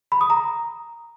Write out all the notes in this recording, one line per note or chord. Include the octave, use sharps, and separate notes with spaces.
B5
D#6
A#5